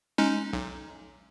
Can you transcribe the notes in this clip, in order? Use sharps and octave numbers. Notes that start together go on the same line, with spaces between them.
G#3 C#4 D#4
B1